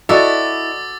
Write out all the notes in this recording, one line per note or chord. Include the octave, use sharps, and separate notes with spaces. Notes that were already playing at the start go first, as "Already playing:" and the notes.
E4 F#4 A4 D5 D#5 D6 E6 A6